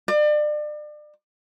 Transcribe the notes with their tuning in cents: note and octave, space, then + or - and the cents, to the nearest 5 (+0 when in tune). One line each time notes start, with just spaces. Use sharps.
D5 +35